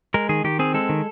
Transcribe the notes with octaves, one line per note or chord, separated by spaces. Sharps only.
G#3 A#4
D#3 G#4
D#3 G4
C4 G#4
G#3 A4
D#3